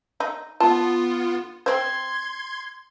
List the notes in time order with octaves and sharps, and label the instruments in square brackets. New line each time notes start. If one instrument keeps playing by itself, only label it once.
[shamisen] D#4
[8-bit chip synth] B3 F4 [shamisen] A5
[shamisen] C4 C5 [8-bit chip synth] C6 G#6